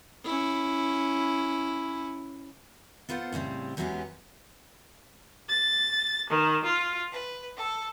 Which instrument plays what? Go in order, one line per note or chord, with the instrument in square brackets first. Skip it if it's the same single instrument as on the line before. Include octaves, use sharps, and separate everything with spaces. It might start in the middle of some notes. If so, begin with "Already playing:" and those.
[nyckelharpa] C#4 E4
[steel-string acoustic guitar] B3 F4 A4 C5 F#5
A2 C#3 G3 C4
E2 F#3 G#3 B3 C#4 G4
[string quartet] A6
D#3
F4
B4
A4